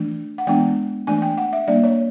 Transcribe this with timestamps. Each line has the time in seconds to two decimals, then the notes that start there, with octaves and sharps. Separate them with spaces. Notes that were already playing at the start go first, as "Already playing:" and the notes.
Already playing: E3 A3 D4
0.38 F#5
0.47 E3 G#3 B3 D4 G5
1.07 E3 A3 D4 G#5
1.22 G5
1.38 F#5
1.53 E5
1.68 G3 A#3 D4 D5
1.84 C#5